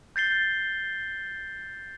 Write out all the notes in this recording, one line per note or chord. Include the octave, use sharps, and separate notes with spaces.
G6 A6 C7 G7